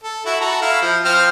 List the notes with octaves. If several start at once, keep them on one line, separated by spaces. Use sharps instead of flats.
A4
E4 F#4
F#4 A4 A#5
E4 F5
F3
F3 C4 F6